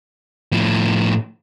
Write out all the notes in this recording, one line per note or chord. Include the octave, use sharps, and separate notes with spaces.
A2 F3